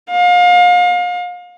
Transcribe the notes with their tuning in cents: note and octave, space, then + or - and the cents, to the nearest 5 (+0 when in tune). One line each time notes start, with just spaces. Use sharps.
F5 +35